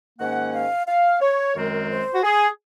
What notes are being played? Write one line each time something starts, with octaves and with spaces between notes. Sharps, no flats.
G#2 D#3 A#3 C#4 F#5
F5
F5
C#5
F#2 D#3 G#3 C4 A#4
C5
F#4
G#4